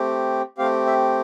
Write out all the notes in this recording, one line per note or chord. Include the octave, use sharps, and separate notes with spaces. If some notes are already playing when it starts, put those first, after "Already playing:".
Already playing: A3 C4 G4
A3 C4 G4 F5
E5